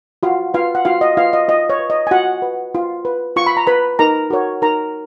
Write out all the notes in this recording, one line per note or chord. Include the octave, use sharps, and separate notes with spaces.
F4 F#4 F5
F4 B4 F5
F#5
F4 F#4 F5
D#5
F4 B4 F5
D#5
F4 D#5
C#5
B4
D#5
G#5
F4 F#4 F#5
B4
F4
B4
F4 C#6
B5
A#5
B4 B5
D#4 A#4 A#5
F#4 A#4 C#5
D#4 A#4 A#5